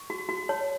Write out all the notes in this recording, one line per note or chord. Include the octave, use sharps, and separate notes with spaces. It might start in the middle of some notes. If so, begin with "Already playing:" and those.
Already playing: C#6
F#4
F#4
C#5